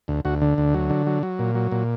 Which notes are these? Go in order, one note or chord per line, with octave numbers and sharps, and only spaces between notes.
D2
D2 F#4
D3
D2
F#3
D3
F#3
F#3
A#2
F#3
A#2